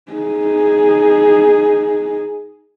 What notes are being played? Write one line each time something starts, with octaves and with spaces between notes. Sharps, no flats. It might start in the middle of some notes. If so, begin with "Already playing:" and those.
D#4 G#4